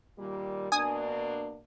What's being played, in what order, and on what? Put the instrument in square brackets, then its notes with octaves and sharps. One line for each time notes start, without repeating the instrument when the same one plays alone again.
[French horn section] A#2 D#3 G3
[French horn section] B2 A#3 D4 [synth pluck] G#5 D#6